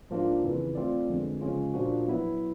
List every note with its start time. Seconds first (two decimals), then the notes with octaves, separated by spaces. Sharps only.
0.10 G#2 F3 A#3 D4 F4
0.43 F2 C#3 E3
0.75 A3 C4 F4 A4 D5
1.08 F2 D3 F3 G#3 B3
1.41 C#3 F3 G#3 C#4 F4
1.74 A#2 F3 A#3 D4 F#4
2.08 F#3 B3 E4